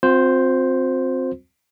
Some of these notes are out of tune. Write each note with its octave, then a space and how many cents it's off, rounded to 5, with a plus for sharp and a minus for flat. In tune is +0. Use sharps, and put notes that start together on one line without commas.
C4 +0 F4 +45 C5 +0